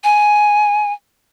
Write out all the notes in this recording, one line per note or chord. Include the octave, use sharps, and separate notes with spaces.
G#5